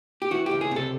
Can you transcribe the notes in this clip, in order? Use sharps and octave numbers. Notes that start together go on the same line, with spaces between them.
G4
E3 F#4
C#2 G4
G#4
C3 A4